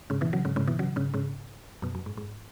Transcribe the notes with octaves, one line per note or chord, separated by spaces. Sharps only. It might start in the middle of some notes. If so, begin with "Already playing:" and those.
G#2 C#3
B2 E3
C#3 F#3
G#2 C#3
G#2 C#3
B2 E3
C#3 F#3
G#2 C#3
G#2 C#3
F#2 B2
F#2
G#2
G#2